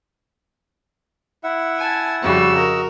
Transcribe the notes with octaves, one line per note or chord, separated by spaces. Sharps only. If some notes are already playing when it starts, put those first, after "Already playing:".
E4 E5 F#5
G#5 A5
F2 C#3 G3 F#4 E6
A#4 D#5